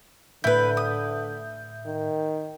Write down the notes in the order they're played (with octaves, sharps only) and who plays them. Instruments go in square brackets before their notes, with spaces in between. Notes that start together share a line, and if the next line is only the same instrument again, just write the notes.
[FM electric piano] A2 E5 G6 [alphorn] D3 [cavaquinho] E4 B4
[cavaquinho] D#6
[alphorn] D#3